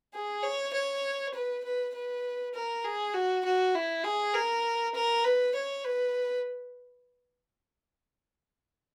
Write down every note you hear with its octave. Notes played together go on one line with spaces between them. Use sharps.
G#4
C#5
C#5
B4
B4
B4
A#4
G#4
F#4
F#4
E4
G#4
A#4
A#4
B4
C#5
B4